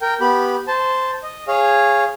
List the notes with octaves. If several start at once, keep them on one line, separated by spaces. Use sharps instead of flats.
A#4 G5
B3 G4 B5
C5 A5
D#5
G#4 C#5 F5